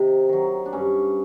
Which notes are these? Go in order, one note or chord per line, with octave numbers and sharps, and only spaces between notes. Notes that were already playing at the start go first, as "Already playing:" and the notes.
Already playing: C3 D#3 D#4
D#3 F#3
D4
G2 C#4